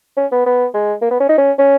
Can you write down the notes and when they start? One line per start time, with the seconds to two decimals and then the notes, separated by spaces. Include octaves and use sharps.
0.17 C#4
0.32 B3
0.46 B3
0.74 G#3
1.02 A#3
1.11 B3
1.20 C#4
1.29 D#4
1.38 C#4
1.59 C#4